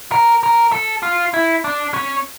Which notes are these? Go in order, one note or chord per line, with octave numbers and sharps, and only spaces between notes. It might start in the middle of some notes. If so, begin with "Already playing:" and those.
A#4
A#4
A4
F4
E4
D4
C#4